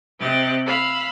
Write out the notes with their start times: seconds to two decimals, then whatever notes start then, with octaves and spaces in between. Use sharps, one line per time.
0.19 C3 C4 G4 D#5 F#6 A6
0.66 F5 B5 E6